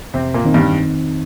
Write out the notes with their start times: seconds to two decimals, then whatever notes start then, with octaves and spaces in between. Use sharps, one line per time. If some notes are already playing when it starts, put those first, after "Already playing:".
0.14 F2 C3 C4
0.34 A#2 A#3
0.44 D#3 C4 D#4
0.54 G2 G3